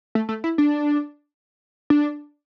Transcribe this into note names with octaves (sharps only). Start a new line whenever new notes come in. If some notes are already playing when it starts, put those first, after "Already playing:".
A3
A3
E4
D4
D4